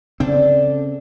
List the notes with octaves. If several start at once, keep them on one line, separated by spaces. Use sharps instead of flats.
C#3 C4 D4 A4